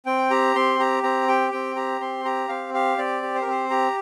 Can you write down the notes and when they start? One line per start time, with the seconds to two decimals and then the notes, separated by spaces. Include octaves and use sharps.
0.06 C4 G5
0.31 G4 A#5
0.56 C4 C6
0.79 G4 A#5
1.03 C4 A#5
1.28 G4 G5
1.52 C4 G5
1.76 G4 A#5
2.01 C4 C6
2.25 G4 A#5
2.49 C4 F5
2.74 G4 F5
2.98 C4 D5
3.23 G4
3.35 C5
3.42 A#4
3.46 C4 C5
3.70 G4 A#5